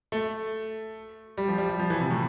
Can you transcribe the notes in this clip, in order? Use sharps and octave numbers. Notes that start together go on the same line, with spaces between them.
A3
G3
F3
G3
G3
F3
E3
C3
A2